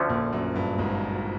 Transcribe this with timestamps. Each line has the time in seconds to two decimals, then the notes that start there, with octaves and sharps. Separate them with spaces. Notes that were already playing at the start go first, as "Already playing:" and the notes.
Already playing: D2 D3 F3 A3 C#4
0.09 A#1 A#2
0.33 F#2
0.56 G2
0.78 G#1 G#2